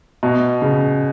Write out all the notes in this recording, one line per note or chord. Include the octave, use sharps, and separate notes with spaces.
B2
C#3